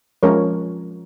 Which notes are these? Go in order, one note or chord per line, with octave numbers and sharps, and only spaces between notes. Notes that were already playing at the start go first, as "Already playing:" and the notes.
F3 G#3 C#4 A#4 C#5